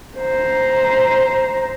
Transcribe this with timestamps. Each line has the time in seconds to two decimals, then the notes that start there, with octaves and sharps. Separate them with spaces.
0.19 C5 A#5